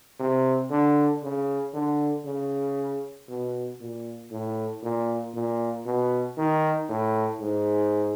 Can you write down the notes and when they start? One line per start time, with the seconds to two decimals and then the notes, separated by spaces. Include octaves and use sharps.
0.20 C3
0.71 D3
1.23 C#3
1.74 D3
2.25 C#3
3.29 B2
3.81 A#2
4.31 A2
4.83 A#2
5.35 A#2
5.86 B2
6.38 D#3
6.89 A2
7.41 G#2